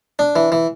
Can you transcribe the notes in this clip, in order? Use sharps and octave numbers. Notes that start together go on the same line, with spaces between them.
D4
E3
E3